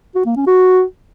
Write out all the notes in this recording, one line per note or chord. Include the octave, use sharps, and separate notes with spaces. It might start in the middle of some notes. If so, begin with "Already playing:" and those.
F#4
A#3
C#4
F#4